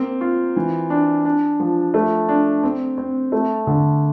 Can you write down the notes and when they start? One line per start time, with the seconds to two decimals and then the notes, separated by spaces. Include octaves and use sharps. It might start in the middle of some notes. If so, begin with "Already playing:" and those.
Already playing: A#3 C4
0.21 F4
0.56 E3
0.90 D4
1.25 D4
1.60 F3
1.94 A3
2.29 D4
2.64 C4
2.98 C4
3.32 A3
3.67 D3